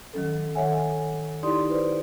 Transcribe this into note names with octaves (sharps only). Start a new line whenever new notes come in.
D#3 F#3 C#4 A4
D#3 A4 C#5 E5 F#5 G#5
D#4 E4 G4 D5 C6 D#6
B4 C5 D5